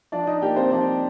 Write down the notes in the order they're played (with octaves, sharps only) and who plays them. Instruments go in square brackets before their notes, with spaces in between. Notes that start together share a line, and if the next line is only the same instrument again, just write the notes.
[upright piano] F3 D4 D5
D#4 D#5
A#3 G4 G5
C4 C5
F3 D4 D5